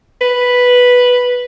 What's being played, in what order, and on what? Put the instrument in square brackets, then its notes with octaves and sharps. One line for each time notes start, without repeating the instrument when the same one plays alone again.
[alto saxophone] B4